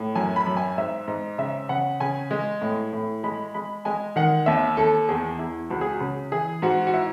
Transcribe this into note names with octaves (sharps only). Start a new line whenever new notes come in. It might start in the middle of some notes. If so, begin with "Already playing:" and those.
Already playing: A2
F#2 G#5
B5
F#2
G#5
G#2 E5
G#2 D#5
C#3 E5
C#3 F#5
C#3 G#5
G#3
A2
A2
G#3 B5
G#3 B5
G#3 G#5
D#3 F#5
D#2 E5
D#2 A4
E2 G#4
E2 E4
C#2 F#4
G#4
F#4
C#3
E3 G#4
G#2 F#4
F#4
E4